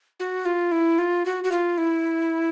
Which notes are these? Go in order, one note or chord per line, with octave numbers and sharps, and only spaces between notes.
F#4
F4
E4
F4
F#4
F#4
F4
E4